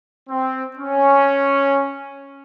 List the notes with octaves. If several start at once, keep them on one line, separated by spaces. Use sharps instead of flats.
C4
C#4